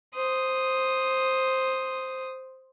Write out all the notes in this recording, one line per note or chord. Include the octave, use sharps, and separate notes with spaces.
C5 D#6